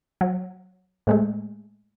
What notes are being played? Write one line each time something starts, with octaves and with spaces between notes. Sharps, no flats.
F#3
A2 G#3 A3